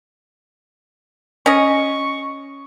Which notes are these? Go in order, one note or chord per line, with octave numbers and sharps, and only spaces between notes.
C#4 D#5 C#6